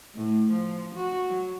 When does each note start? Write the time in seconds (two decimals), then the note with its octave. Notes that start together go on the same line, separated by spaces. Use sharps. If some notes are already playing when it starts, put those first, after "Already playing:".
0.15 A2
0.51 F3
0.95 F#4
1.29 F#3